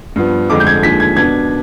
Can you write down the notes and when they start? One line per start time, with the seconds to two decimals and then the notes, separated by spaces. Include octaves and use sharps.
0.16 G2 F3 B3
0.50 F2 D3 G#3 D6
0.60 G6
0.67 G#6
0.83 D#2 D3 F3 G#3 B6
1.00 G#6
1.16 B2 B3 D4 G#6